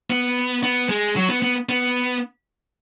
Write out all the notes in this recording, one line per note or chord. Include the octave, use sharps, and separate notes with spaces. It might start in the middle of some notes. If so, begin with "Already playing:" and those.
B3
B3
G#3
F#3
B3
B3
B3